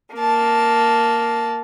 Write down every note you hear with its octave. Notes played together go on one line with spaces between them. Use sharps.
A#3 A5